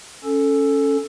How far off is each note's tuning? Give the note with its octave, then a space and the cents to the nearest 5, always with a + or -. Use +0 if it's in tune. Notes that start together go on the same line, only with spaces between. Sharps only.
C#4 +0 A4 +0